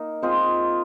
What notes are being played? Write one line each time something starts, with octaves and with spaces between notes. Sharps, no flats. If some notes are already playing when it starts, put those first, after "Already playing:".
Already playing: A#3 D#4 A#4
G#3 C4 F4 C5 D#5